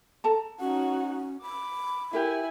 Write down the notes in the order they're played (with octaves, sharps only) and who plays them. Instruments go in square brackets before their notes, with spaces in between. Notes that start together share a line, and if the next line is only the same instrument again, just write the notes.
[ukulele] A4 A5 A#5
[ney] C#4 [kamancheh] D#4 F#4
[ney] B5 [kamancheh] D6
[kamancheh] E4 G#5 [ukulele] G4 A#4 E5